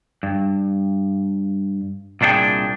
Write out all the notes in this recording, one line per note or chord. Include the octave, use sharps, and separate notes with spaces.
G2
C2 A#2 D4 E4 G#4 G5